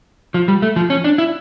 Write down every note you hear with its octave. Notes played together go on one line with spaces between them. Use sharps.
F3
G3
A3
F3
C#4
D4
E4